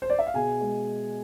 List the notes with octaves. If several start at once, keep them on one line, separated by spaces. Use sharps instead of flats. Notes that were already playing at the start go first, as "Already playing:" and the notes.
C5
D5
E5
F5
B2 G#4 G#5
G#3